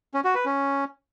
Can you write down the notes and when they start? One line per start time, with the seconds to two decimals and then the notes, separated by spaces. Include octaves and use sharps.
0.14 C#4
0.24 F#4
0.35 B4
0.45 C#4